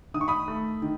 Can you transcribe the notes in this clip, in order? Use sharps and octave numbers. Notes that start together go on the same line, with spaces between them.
D#3 D#6
C#6
B5 D#6
A3
D#3